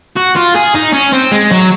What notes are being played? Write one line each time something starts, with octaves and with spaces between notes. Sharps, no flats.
F#4
F4
G#4
D#4
C#4
C4
G#3
F#3